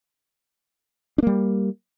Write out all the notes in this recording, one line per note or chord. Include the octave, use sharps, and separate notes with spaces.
G3 A#3 D4